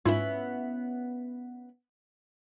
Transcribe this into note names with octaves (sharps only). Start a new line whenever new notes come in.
G#2 B3 C#4 E4 F4 G#6